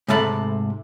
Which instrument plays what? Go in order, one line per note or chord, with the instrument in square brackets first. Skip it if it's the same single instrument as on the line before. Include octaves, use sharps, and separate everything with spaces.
[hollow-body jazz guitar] G#2 C3 A3 A5 B5